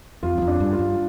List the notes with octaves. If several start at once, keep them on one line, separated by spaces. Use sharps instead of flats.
F2 F4
G2
F2
D4
G2
F4
G2